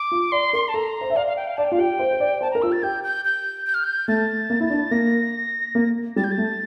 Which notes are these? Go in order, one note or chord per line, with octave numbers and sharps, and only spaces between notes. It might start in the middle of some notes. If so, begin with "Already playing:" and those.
Already playing: D6
F4
D5 C6
A#4 C6
A5
A4 A#5
C5
E5
D5 F5
F5
G5
F5
D5 A5
G5
F4 F5
G4 G5
C5
C5
D5
C5 A5
A#4 A#5
F4 E6
G4
A6
G4 G6
G6
G6
G6
F6
G6
A3 A6
A#3
E4
D4
A#3 A#6
A#3
G3 A6
G6
A6
A3